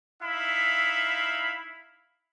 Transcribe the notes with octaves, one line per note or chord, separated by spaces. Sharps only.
D#4 E4 E5 F5 B5